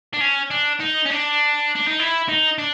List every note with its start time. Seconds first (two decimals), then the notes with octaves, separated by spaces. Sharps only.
0.13 D4
0.21 C#4
0.51 D4
0.80 D#4
1.05 C#4
1.10 D4
1.75 D4
1.87 D#4
1.99 E4
2.29 D#4
2.58 D4